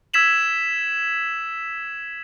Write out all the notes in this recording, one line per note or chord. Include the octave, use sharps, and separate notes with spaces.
E6 G#6 B6 E7 F#7